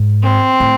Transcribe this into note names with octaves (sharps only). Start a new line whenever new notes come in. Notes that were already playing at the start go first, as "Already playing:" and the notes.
Already playing: G#2
C4
A2